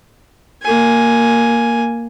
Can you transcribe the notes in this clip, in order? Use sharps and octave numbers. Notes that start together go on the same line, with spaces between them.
A#3 G#5